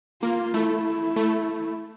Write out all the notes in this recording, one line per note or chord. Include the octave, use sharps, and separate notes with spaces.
A#3 F4
A3 E4
A3